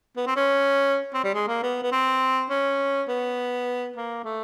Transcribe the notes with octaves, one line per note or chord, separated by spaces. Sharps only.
B3
C4
C#4
C4
G3
G#3
A#3
B3
B3
C4
C#4
B3
A#3
A3